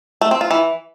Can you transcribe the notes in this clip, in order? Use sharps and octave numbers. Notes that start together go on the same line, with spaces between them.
A3
C4
F4
E3